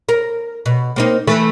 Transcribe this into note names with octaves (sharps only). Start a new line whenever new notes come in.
A#4
B2
A#3 C4 D#4
E3 A3 B4